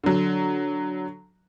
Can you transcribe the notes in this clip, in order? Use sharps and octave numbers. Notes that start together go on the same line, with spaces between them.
D3 F#3